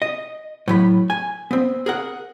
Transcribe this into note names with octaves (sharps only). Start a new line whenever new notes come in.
D#5
A2 F#3 B5
G#5
B3 C4
G#4 A#4 F#5